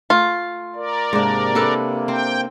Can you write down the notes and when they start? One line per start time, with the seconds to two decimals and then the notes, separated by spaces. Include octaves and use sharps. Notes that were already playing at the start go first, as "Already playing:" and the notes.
0.10 A3 F4
0.75 A#4 D5
1.13 G#2 C3 A#3 D4
1.55 D4 A4 B4
2.08 C4 G5